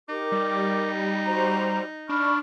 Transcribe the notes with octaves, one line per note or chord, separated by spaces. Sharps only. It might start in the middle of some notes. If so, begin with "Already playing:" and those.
D#4 G4 A#4 D6
G3
F#4 C5 A#5
D4 B5 C#6 F6